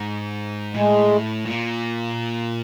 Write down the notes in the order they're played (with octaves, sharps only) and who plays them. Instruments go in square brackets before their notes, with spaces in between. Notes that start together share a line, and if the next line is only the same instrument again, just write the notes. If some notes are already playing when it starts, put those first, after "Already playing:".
Already playing: [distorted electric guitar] G#2
[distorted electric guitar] A2 [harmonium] G#3
[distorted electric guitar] A#2